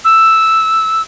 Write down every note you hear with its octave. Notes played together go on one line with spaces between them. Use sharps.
E6